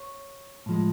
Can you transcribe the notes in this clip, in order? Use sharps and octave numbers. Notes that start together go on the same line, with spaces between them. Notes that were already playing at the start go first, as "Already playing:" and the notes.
Already playing: C#5
A2 F3 G#3